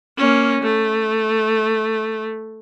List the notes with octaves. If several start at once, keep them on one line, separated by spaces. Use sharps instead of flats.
A#3 C#4
A3